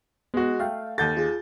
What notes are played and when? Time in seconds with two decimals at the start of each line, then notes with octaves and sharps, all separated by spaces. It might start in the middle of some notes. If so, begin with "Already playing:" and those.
0.34 G#3 B3 F#4
0.60 A3 F5 G5
0.98 D#2 A4 F#5 G6 A6
1.17 F4 G#4